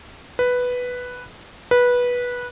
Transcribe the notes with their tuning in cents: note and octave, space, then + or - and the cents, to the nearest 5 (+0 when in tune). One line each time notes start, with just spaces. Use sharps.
B4 +0
B4 -15